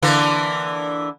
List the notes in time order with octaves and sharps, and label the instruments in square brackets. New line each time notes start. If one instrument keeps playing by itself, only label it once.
[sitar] D3 E3 A#3